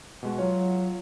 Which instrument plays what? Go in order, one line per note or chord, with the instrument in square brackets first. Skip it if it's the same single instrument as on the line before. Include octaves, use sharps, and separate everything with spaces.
[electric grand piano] B2 G#3 F#4
[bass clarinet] F#3 [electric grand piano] F4 C#5